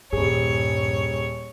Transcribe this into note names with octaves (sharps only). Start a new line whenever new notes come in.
D#1 G2 G#4 C#5